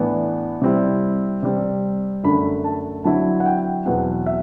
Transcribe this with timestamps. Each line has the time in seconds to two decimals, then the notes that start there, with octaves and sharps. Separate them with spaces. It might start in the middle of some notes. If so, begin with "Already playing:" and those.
Already playing: A2 E3 B3 D4
0.62 C3 G3 C4 E4
1.43 C3 G3 C4
2.24 F#2 D3 A3 B5
2.64 A5
3.04 D3 F#3 C4 E4 A5
3.40 F#5
3.46 G5
3.85 E2 B2 F#3 C4 F#5
4.26 E5